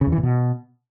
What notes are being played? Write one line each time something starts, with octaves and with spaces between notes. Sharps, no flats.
C#3
E2
E3
A#2
B2